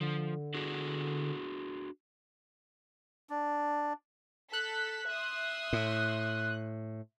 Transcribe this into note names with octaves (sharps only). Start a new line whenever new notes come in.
D3 F3
D4 F#4 G#4
D4
A4 F#6 B6
E5 C6 D#6
A2